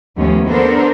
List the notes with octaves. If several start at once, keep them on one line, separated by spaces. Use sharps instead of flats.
D#2 F3 A3 B3 C#4
B3 D4 A4 A#4 C5